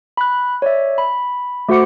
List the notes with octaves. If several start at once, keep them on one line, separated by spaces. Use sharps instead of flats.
B5 F#6
C#5 D5 E5
B5
A3 F#4 C5 F#5 D6 C#7